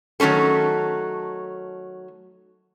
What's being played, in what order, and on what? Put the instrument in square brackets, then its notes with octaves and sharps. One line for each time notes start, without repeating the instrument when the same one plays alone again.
[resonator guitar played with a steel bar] D#3 F#3 A3 C#4 A4